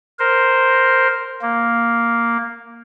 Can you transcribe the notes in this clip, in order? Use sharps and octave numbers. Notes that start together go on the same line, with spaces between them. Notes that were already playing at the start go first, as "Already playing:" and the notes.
A#4 C5
A#3